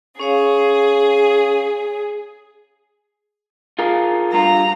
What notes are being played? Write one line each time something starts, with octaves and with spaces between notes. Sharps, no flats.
C#4 G#4 C#5 F5
F4 G#4 A#4
G2 F4 A#5